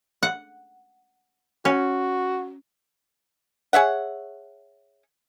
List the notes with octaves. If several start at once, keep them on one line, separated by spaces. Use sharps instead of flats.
F#5
C#4 F#4
G#4 C#5 E5 F#5